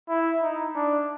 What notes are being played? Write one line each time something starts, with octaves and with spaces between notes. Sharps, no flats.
E4
D#4
D4